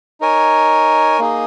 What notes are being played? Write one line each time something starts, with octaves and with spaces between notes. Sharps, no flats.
D#4 A#4 C#5 G#5
A#3 D#4 G#4 D#5